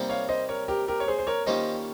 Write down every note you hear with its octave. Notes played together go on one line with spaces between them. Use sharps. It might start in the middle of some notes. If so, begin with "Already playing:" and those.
Already playing: C3 G3 A#3 D#4
C#5 F5
C5 D#5
A#4 C#5
G4 A#4
G4 A#4
C#5
G#4 C5
C5
A#4 C#5
D#3 G3 A#3 C#4 F4 C5 D#5